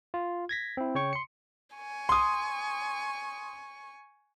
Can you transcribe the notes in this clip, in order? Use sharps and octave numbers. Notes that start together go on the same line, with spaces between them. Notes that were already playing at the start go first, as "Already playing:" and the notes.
F4
G#6 A#6 B6
C4 E4
C#3 C#5 G5 C#6
C6 C#7
G#5 C#6
C6 D#6